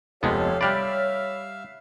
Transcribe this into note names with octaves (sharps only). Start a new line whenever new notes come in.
F1 F3 G#3 B3 G4 A4 C#5 F5
G3 G4 D5 E5 F5 B5 F6 F#6